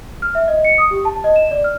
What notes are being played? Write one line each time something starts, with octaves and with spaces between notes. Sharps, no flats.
F6
E5
D#5
C#7
D#6
G4
A5
D#5
E7
D5
F6